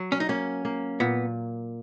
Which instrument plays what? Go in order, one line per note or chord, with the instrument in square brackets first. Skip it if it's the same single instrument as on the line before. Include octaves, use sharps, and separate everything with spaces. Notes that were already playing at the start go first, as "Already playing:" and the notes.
Already playing: [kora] F#3
[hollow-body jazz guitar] C#4
D#4
[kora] A#3 [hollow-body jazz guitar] C#4
[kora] A#3
[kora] A#2 [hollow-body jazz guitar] B3